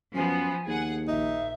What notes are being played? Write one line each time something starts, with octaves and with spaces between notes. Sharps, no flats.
F#2 F3 B3 G#5
D#2 G#4 F#5
A#1 D#4 E5